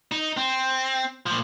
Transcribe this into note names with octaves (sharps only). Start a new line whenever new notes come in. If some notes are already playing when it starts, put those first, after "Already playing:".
D#4
C4
A#2 F3